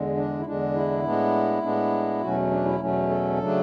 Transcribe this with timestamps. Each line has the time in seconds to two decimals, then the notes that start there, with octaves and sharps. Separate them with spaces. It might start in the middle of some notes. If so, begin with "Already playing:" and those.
Already playing: E2 D3 G#3
0.16 D4
0.39 E4
0.45 E2 D3 G#3 D4
0.75 E4
1.04 A2 G#3 B3 D4
1.62 A2 G#3 B3 D4
2.21 E2 B2 F#3 A3 C#4 F#4
2.51 D4
2.65 E4
2.80 E2 B2 F#3 A3 C#4
3.09 A4
3.40 C#3 F#3 A3 D4